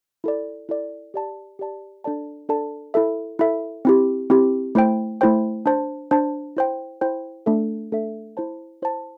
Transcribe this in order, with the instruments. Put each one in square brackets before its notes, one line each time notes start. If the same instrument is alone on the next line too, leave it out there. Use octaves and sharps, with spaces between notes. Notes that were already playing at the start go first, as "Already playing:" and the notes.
[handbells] E4 A4 D5
E4 A4 D5
G4 D5 A5
G4 D5 A5
D4 A4 D5 A5
D4 A4 D5 A5
E4 A4 E5
E4 A4 E5
C4 E4 G4
C4 E4 G4
A3 E4 C5 G5
A3 E4 C5 G5
D4 C5 A5
D4 C5 A5
E4 C5 G5
E4 C5 G5
A3 D4 A4 E5
A3 D4 A4 E5
E4 C5 A5
E4 C5 A5